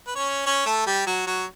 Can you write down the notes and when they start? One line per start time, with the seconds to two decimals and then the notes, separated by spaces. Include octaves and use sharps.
0.07 B4
0.15 C#4 C#5
0.45 C#4 C#5
0.66 A3 A4
0.86 G3 G4
1.06 F#3 F#4
1.26 F#3 F#4